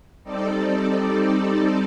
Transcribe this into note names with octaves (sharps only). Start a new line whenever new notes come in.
G3 C4 D#4 A4 D5